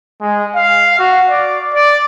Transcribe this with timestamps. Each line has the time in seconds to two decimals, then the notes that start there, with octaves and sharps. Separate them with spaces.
0.21 G#3
0.55 F5
0.99 F#4
1.29 D5
1.75 D5